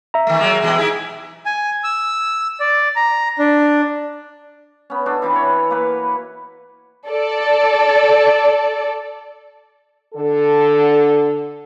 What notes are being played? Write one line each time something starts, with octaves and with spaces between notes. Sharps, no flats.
E5 A#5
D#3 A3
F#3 G#3 A#3
B2 E3 G#3
D#4 E4 G#4
G#5
E6
D5
A#5
D4
B3 C#4
D4 F#4 A4
E3 C4 E4
C#5
A#3 B4
A4 D5
D3 A4